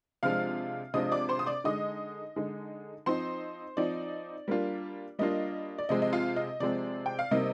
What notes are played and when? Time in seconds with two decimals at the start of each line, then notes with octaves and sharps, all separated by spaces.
0.23 C3 F3 G#3 D4 F4 F5 F6
0.94 C3 F3 G#3 D4 F4 D#5 D#6
1.12 D5 D6
1.29 C5 C6
1.39 D#6
1.47 D5 D6
1.64 D3 G#3 D#4 D#5 D#6
2.36 D3 G#3 D#4
3.06 F3 C4 D#4 C5 C6
3.77 F3 C4 D#4 D5
4.48 G3 A#3 D4 F4
5.19 G3 A#3 D4 F4 D#5
5.78 D5
5.89 C3 F3 G#3 C4 D#5
6.02 D#5
6.13 F4 F5
6.36 D#5
6.60 C3 F3 G#3 C4 D5
7.06 G5
7.19 F5
7.31 C3 G3 A#3 D#4 D#5